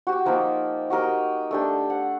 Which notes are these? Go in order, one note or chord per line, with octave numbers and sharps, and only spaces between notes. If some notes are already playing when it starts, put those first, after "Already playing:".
F#4 G4
F3 A#3 D#4 G4
F#4 G4 A#4 D#5
A3 D4 G4
F#5